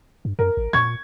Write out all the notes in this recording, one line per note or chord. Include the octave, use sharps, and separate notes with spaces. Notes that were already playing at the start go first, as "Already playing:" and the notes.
G2
F#2 A#4
A1
A#2 C#6 G#6